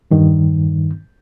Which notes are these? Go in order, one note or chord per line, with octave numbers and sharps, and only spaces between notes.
E2 G2 D#3